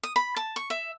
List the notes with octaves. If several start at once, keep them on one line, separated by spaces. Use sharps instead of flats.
D#6
B5
A5
C#6
E5